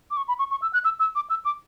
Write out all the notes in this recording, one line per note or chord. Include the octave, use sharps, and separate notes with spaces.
D6
C#6
B5
C#6
C#6
E6
F#6
E6
E6
D6
E6
D6